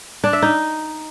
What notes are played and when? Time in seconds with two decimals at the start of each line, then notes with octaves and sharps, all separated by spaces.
0.24 D4
0.33 E5
0.42 D#4